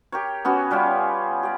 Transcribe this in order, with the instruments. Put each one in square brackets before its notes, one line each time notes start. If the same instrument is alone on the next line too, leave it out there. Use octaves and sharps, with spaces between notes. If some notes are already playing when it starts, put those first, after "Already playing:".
[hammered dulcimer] G4 A#4 C#5
B3 C#4 F#4
G3 C#4 F4 G4
G4 D5